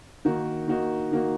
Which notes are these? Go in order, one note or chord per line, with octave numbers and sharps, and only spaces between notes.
D#3 A#3 D#4 F#4
D#3 A#3 D#4 F#4
D#3 A#3 D#4 F#4